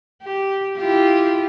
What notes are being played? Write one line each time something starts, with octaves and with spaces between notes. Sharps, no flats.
G4
E4 F4 G4